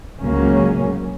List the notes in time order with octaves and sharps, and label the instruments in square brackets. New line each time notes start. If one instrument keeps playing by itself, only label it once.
[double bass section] C#2 C#3 F#3 A#3 C#4